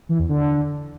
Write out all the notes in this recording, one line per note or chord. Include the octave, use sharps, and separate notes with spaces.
E3
E2
D3